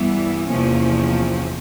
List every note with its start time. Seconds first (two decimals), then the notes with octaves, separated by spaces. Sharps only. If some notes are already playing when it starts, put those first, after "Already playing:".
Already playing: G2 E3 G3 B3
0.47 E2 C3 F3 A#3 C#4